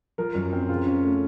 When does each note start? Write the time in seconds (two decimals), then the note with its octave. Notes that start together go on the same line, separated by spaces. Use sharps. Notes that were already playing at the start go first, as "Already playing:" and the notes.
0.18 F3 A#4
0.35 F#2
0.53 C4
0.69 C#3 F4
0.87 C#4
1.04 A3